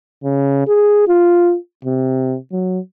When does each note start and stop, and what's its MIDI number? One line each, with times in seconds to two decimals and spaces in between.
0.24 0.64 49
0.67 1.06 68
1.08 1.56 65
1.85 2.37 48
2.52 2.79 54